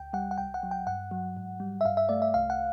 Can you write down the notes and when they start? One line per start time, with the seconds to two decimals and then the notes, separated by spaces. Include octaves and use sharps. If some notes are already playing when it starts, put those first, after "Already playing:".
Already playing: D2 G5
0.13 G3 F#5
0.31 F#5
0.38 C2 G5
0.54 F#5
0.63 F#3
0.71 G5
0.87 G2 F#5
1.11 F#3
1.37 G#2
1.60 G3
1.81 E5
1.85 G2 F5
1.97 E5
2.09 A3 D5
2.22 E5
2.34 C2 F5
2.50 F#5